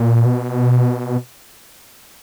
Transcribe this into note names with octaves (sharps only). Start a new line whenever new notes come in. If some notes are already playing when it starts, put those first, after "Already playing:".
Already playing: A#2
B2